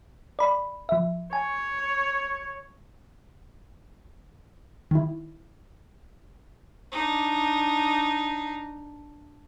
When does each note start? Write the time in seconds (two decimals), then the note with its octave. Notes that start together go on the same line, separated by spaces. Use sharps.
0.39 D5 B5
0.89 F3 E5
1.33 C#5 G#5
4.91 D#3 E4
6.92 D4 D#4